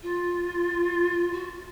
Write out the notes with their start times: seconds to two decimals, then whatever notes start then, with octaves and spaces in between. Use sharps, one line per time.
0.03 F4
1.33 F#4